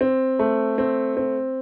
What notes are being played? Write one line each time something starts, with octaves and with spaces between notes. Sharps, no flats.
C4
A3
C4
C4